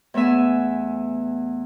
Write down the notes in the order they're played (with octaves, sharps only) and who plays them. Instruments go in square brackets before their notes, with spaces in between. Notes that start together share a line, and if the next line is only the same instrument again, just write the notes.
[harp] E2 A3 B3 E5 G#5